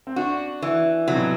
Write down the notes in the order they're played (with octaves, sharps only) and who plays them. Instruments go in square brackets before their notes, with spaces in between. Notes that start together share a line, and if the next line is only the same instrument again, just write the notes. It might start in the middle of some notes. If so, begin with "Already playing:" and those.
[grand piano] C4
[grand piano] D4 [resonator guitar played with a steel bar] F#4
[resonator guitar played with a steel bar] E3
[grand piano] C3 [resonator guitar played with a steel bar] F#3
[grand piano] B2